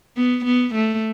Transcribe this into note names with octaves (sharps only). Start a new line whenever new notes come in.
B3
B3
A3